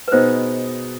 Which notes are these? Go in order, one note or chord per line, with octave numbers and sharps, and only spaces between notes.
B4
B2 B3 D#4 G#4 C5